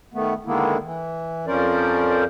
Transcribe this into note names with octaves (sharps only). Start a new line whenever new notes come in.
D#3 A3 B3
D3 D#3 G#3 A#3 B3 E4
E3
F2 F3 C#4 A#4 C5 D5